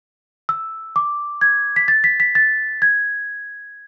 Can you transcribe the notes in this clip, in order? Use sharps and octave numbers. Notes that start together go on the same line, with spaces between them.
E6
D6
G#6
B6
A6
B6
B6
A6
G#6